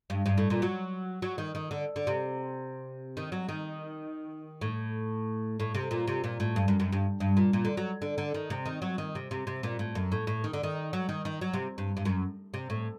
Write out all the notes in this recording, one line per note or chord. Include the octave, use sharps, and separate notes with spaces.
G2
G2
A2
A#2
F#3
F#3
D#3
D#3
D3
D3
C3
D#3
F#3
D#3
A2
A2
C3
A#2
C3
A#2
A2
G2
F#2
F#2
G2
G2
A#2
A#2
D3
F#3
D3
D3
D#3
C3
D#3
F#3
D#3
C3
C3
C3
A#2
A2
F#2
A2
A2
D#3
D3
D#3
F#3
D#3
D#3
F#3
C3
G2
G2
F#2
C3
A2